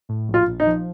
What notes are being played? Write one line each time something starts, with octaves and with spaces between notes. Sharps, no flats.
A2
A#1
F4
A#1
D#4
F3